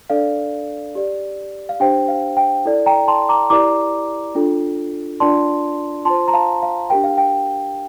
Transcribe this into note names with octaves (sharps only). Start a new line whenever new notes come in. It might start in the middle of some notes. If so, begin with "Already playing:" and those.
D4 A4 D5 F5
G4 D5
F5
D4 G4 C5 G5
F5
G5
E4 A4 D5
G5 A#5
A5 C6
A#5 D6
E4 G4 A#4 D5 A#5 D6
D4 F4 A4
D4 F4 A#4 D5 A5 C6
F4 C5 A5 C6
A#5
F5 A5
F5
D4 G4 A#4 G5
F5
G5